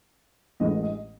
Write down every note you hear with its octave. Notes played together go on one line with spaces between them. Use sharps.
A1 A2 E3 G#3 D#5
D#5